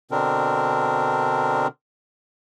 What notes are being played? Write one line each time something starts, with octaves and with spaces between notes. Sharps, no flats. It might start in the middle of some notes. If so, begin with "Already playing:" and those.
B2 D3 C4 D4 A#4